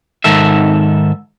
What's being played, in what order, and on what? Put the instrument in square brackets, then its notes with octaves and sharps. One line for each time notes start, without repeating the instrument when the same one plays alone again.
[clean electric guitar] G#2 D#3 A4 E5